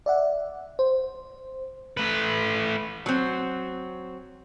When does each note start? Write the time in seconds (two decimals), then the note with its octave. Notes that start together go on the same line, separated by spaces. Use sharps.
0.06 D5 E5 F#5
0.79 C5
1.97 A3 B4
3.06 F#3 C4